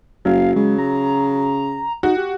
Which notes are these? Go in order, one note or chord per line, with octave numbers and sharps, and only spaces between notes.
F#1 F#3 F5
C#3 G#3
A#5
D#4 F#4
G4